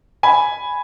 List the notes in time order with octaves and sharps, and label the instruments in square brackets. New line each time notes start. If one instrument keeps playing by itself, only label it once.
[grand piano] G#5 B5